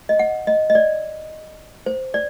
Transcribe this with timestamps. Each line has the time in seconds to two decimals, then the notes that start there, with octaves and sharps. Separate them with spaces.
0.09 D#5
0.19 F#5
0.47 D#5
0.70 D#5
0.75 D5
1.86 C5
2.14 D5